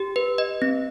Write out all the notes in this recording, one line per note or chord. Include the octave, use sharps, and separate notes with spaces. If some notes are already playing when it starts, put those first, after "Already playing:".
Already playing: G4
B4
D#5
C4